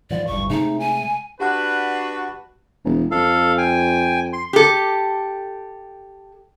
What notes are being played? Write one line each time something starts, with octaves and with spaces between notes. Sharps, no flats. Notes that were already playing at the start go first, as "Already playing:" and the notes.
G#2 E3 F3 D5
D1 G1 G2 C#6
C3 G#3 A3 D#4
G#5
D4 F#4 G4 B4 F#5 F#6
E1
F2 A4 F5
G5 G#5
C6
G4 A4